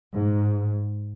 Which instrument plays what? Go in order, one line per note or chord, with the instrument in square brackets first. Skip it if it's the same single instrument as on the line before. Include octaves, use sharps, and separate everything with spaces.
[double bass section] G#2